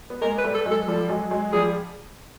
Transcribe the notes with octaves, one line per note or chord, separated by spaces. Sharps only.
B3
G#3 A#3 A#4
B4
G3 A3
A4
F#3 G#3
A4
F3 G3 A4
F#3 G#3
F#3 G#3
F3 G3 G#4